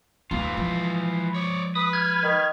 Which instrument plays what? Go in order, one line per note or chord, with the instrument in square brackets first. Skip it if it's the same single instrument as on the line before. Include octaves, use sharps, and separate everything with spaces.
[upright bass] D2 [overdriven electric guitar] E3 F4
[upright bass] F3 G#3
[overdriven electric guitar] C#5 D5
[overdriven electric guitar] B4 [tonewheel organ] D#6
[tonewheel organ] F6 G#6
[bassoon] D#3